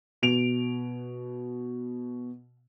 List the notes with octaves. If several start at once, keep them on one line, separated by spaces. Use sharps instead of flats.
B2 D7 F7